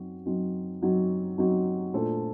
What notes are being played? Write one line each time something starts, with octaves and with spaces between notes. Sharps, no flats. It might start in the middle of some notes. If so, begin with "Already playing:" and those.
Already playing: F#2 F#3 C4 D#4 F#4
F#2 F#3 C4 D#4 F#4
F#2 F#3 C4 D#4 F#4
F#2 F#3 C4 D#4 F#4
A#2 A3 D4 A4 C5